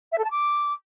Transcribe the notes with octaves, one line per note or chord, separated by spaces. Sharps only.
E5
A4
A5
D6